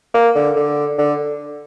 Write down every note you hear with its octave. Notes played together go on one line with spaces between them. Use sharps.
A#3
D3
D3
D3